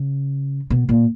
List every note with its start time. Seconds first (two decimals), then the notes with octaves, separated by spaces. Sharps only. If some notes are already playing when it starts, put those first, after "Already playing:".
Already playing: C#3
0.70 B2
0.89 A#2